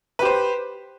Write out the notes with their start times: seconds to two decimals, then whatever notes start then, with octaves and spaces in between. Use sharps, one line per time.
0.19 B4
0.22 G4
0.25 C5